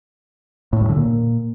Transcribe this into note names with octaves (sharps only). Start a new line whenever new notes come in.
A2
G2
D3
A#2